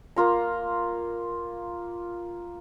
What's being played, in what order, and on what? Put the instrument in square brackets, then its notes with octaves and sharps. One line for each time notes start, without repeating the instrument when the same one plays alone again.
[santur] A#3 F4 A#5